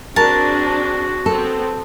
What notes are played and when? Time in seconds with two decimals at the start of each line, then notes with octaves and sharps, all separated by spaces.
0.16 C4 D4 F#4 G#4 A#4 A5
1.26 B3 C4 A4